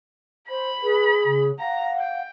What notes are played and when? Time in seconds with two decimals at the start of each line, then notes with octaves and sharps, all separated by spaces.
0.50 C5 B5
0.83 G#4 B4
1.25 C#3
1.59 F5 F#5 A#5
1.99 G5